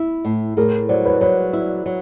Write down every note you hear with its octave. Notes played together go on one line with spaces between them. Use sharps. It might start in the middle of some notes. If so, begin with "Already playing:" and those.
Already playing: E4
A2
A2 G#4 A#4
F#3 C5 D5
B4 C#5
F#3 B4 C#5
E4
F#3